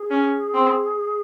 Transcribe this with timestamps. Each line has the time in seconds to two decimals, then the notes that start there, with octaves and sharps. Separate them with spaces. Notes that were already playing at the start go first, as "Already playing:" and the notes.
Already playing: G#4
0.10 C#4
0.54 C4